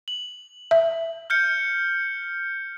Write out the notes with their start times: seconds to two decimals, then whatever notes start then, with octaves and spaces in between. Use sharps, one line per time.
0.08 F#7
0.71 E5
1.30 F6 G6 C#7